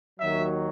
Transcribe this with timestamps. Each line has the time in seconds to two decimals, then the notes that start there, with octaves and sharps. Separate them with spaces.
0.20 D#2 D#3 F#3 E5